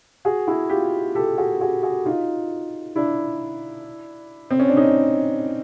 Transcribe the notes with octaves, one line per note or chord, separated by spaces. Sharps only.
F#4 G#4
E4 F#4
F4 G4
G4 A4
F#4 G#4
F#4 G#4
F#4 G#4
D#4 F4
D4 E4
C4
C#4
D4
C#4 D#4